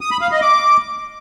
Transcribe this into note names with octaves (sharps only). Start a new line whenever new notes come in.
D#6
B5
F5
D#5
D6